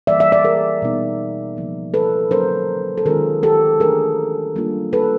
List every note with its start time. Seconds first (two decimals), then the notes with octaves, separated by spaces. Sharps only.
0.07 E3 G3 A#3 D5 E5
0.20 D5 E5
0.32 D5 E5
0.44 G#4 A#4
0.82 B2 G3 B3 D#4
1.57 C#3 F3 A#3
1.94 A4 B4
2.31 D3 F#3 A#3 C#4 A#4 C5
2.98 A4
3.05 D#3 G#3 C#4 F4 G#4 A#4
3.43 G4 A4
3.80 E3 A3 D4 G#4 A#4
4.56 G3 A#3 D4 F4
4.93 A4 B4